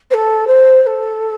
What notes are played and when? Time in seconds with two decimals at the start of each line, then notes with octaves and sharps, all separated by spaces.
0.10 C5
0.14 A4
0.47 C5
0.83 C5
0.86 A4